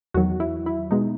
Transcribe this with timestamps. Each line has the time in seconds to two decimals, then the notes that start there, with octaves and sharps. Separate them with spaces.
0.14 E2 D#3 F#3 F#4
0.40 E4
0.66 E4
0.91 B2 G#3 D#4